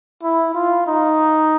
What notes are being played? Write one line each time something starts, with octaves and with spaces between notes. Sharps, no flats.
E4
F4
D#4